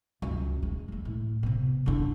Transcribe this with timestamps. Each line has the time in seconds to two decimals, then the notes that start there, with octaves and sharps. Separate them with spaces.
0.22 C#2 F#2
0.63 G#3
0.88 D3 G#3
1.05 A2
1.43 C3 B3
1.86 F#1 D3